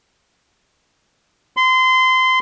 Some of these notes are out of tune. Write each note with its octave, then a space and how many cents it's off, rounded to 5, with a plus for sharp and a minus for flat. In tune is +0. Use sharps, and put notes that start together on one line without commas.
C6 -25